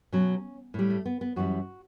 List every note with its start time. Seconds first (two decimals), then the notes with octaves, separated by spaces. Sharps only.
0.12 B2 F#3 C#4
0.74 A2 G3
0.90 A3
1.05 B3
1.21 B3
1.36 F#2 E3 G3 F#4